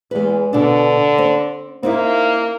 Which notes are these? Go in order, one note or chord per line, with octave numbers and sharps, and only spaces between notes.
E2 G#3 B4
B2 D3 D4
C4
A#3 C4 D#4 E4